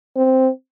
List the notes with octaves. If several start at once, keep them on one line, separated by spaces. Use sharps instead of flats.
C4